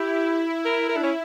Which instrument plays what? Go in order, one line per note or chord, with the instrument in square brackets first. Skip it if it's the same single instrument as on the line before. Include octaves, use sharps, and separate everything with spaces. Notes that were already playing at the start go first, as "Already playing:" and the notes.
Already playing: [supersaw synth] E4 [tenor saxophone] G4
[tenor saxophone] A#4
A#4
D4
C#4